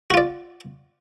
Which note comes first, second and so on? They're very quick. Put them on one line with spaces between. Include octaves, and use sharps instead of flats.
F#4 F4 D5